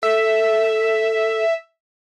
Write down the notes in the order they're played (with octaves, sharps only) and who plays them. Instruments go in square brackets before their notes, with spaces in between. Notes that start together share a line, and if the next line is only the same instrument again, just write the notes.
[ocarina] A4 [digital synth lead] E5